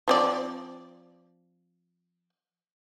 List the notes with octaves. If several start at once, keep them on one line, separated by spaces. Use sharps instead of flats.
F3 C4 D5